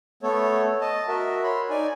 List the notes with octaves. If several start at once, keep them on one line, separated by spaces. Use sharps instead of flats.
A3 B3 A4 C#5
D#5 A5
F#4 A#4 E5
C#5 B5 C6
D#4 D5 G#5